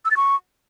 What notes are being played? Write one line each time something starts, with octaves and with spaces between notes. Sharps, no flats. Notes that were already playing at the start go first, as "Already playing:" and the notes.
E6
A6
C#6